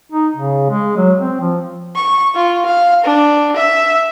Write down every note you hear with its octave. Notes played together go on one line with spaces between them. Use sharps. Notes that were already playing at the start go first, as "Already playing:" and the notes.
D#4
C#3
G#3
F#3
C4
F3
C#6
F4
F5
D4
E5